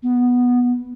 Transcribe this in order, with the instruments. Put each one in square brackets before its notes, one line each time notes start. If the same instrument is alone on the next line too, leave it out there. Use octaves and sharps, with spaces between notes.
[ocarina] B3